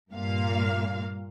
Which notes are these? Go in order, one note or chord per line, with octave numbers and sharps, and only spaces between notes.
G2 A#2 A#3 F5